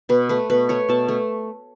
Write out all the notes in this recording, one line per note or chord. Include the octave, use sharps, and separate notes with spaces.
B2 B4
A3 B4
B2 B4
A3 C#5
B2 A5
A3